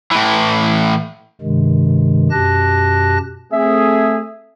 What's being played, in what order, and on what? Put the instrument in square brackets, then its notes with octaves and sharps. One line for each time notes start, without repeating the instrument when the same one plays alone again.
[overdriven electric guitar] A2 E3
[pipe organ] G2 C3 D#3 G#3
F#2 B2 G4 A5 F#6 A#6
[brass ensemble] A3 C4 G#4 [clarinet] E5